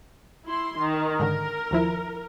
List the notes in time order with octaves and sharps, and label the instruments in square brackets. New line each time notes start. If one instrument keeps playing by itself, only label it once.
[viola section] E4 C6
D#3
[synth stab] G#2 D3 D#3 [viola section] A#4
[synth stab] D#2 F3 E4